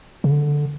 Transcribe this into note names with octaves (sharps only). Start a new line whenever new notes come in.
C#3
D3